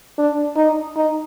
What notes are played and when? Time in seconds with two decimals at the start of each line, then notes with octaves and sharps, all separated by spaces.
0.18 D4
0.57 D#4
0.96 D#4